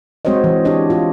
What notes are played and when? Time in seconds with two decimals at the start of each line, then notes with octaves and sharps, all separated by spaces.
0.25 G#3 C4 F#4 C5 C#5 D#5
0.44 E3
0.65 D4 G4 C#5 D#5
0.90 F4